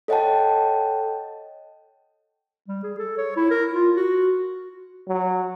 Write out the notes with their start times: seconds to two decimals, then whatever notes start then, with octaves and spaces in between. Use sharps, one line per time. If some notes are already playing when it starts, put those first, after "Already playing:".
0.08 A4 C#5 D#5 F#5 G5 A5
2.68 G3
2.83 G#4
2.98 A4
3.18 C#5
3.37 E4
3.51 A#4
3.73 F4
3.97 F#4
5.08 F#3